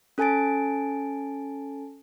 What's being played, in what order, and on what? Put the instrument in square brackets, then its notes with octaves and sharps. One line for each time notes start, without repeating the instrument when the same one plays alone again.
[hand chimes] C#4 A4 G#5 A5 A6 D7